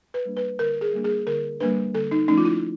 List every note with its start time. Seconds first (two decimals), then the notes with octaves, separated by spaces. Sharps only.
0.14 B4
0.25 G3 A#3 D4
0.37 B4
0.59 D3 A#4
0.81 G#4
0.93 G3 A#3 D4
1.04 G#4
1.27 D3 A#4
1.60 G3 A#3 D4 B4
1.94 D3 A4
2.11 D#4
2.28 F3 A3 C#4 D#4
2.38 F4
2.45 E4